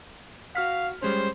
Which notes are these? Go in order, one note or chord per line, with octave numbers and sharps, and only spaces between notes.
F#4 F5 F6 B6
G3 G#3 C#4 C5